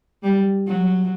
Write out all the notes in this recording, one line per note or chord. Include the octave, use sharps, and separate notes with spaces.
G3
F#3